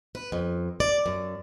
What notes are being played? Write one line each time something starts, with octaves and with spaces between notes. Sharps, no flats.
B4
F2
D5
F#2